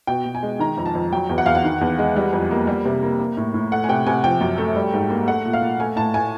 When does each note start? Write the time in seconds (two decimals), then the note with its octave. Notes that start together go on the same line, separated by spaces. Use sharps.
0.07 B2 G5
0.26 B2
0.35 G#5
0.43 G#3
0.59 D#3 A#5
0.77 F2
0.86 A5
0.95 F2
1.13 F#3 G5
1.29 E2
1.38 F#5
1.46 E2 F5
1.55 F#5
1.64 D#3
1.81 E2
1.99 G#3
2.16 G3
2.33 F2
2.51 A#3
2.67 G3
2.85 C3
3.03 A#3
3.19 A#3
3.37 A2
3.54 A2
3.72 A3 F#5
3.84 G#5
3.89 C3 G5
4.06 C3 G#5
4.24 F3 G5
4.41 F#2
4.58 A3
4.76 G3
4.93 G#2
5.10 A#3
5.27 A3 F#5
5.45 A#2
5.53 F5
5.62 A#2
5.80 A3 G#5
5.96 A2 A5
6.14 A2 G#5